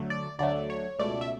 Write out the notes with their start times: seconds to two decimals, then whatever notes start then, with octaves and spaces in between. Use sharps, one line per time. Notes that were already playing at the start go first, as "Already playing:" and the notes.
Already playing: D2 D3 F#3 A3
0.10 D5
0.39 D2 D3 F#3 A3 D5
0.70 C#5
0.99 C#2 B2 A3 D5
1.21 E5